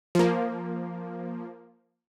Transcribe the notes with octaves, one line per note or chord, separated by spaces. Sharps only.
F3 A#3